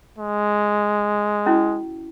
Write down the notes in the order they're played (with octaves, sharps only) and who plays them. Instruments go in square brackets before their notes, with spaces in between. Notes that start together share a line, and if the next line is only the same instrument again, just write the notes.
[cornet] G#3
[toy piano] C#4 E4 F#4